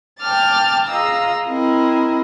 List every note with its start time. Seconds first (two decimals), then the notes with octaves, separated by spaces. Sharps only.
0.21 G5 A5 D6 F6 A6
0.88 F4 G#4 D#5 F5 A#5 E6
1.47 C4 E4 A#4 D#5